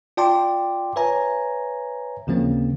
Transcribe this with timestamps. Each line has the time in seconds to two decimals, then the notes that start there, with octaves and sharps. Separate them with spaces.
0.17 F4 D5 G5 A5 C6 D6
0.96 B4 C#5 E5 G#5 A#5
2.27 D#2 C#3 F3 A#3 C4